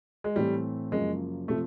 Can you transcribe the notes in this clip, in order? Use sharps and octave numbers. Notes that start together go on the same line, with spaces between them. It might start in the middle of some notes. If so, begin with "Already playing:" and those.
G#3
A2 E3 G3 A3 C4
F#2 C#3 F3 G#3 A#3
C3 F3 A3